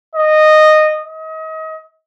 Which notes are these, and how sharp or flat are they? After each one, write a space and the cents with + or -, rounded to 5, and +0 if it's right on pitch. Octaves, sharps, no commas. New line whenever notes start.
D#5 -15
D#5 +35